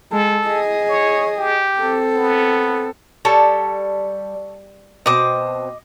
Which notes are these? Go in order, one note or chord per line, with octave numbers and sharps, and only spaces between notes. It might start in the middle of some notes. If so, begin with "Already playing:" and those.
G#3 A4
G#4 D#5
C#5
G4
C4 A4
B3
G3 A4 C#5 A5
B2 C4 D#5 A5 D6